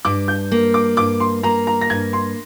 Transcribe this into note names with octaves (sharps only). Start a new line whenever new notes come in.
G2 D6
G6
A#3
D6
G2 D6
C6
A#3 A#5
A#5
A#6
G2 G#6
C6